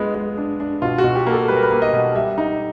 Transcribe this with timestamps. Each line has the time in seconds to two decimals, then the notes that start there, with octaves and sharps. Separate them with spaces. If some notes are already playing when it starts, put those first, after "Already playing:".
Already playing: G#3 B3 D4 F4
0.15 G#3
0.37 D4
0.60 D4
0.82 B2 F4
0.98 F#4
1.04 B2
1.15 G4
1.27 A#3
1.32 A4
1.48 G3 B4
1.56 A#4
1.63 B4
1.71 A#3
1.82 D#5
1.93 B2
2.15 G3 E5
2.38 D#4